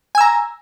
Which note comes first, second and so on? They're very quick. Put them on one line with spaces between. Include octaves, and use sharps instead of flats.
G#5 E6 A#5